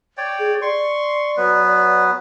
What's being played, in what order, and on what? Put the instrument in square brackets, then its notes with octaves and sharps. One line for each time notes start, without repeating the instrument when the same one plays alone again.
[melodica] C#5 D5 G5
[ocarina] G#4
[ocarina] D5 [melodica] C6 C#6
[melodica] F#3 B3 B4